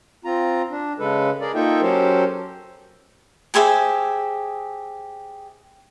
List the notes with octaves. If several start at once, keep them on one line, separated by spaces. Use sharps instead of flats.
C4 F4 A#5
D4
C#3 G#3 A4 B4
G#4 A#4 D5
A#3 D#4 F4 A4 E5 G5
F#3 C#4 G4 A4 A#4 C5
G4 G#4 C5 E5